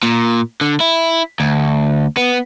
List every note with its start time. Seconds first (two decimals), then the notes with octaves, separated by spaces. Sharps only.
0.03 A#2
0.61 D3
0.80 E4
1.40 D2
2.17 B3